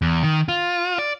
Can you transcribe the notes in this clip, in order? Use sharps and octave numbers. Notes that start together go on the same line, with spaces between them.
E2
D#3
F4
D5